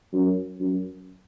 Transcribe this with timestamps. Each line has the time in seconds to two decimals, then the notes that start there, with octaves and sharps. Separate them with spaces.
0.13 F#2
0.60 F#2